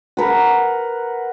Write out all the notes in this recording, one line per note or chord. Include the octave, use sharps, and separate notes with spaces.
A#4 B4 F#5